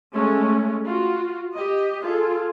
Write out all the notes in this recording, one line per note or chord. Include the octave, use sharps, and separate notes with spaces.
G#3 A3 C#4
F4 F#4
G4 D#5
F4 G#4 A4